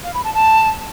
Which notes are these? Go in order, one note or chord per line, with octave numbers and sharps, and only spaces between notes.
F5
B5
A5
A5